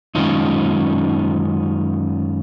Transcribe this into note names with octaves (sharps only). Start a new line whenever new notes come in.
F#2 D#3 G#3 C#4 D#4 F4